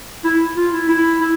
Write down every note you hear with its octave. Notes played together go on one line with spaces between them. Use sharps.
E4
F4
E4
E4
E4